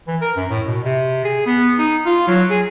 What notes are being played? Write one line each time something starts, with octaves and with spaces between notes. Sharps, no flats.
E3
A#4
F#2
A2
B2
C3
G#4
B3
D#4
F4
F#3
G#4